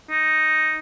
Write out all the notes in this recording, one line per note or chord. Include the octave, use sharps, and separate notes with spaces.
D#4